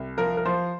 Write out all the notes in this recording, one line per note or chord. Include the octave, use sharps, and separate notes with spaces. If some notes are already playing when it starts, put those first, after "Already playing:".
Already playing: C2
F3 A#4
A#4
F3 C5